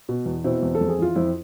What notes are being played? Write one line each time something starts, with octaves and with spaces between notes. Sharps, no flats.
B2
E2
B2 C4 E4
E2
A4
F2
G#4
E3 F4
F2 C4 E4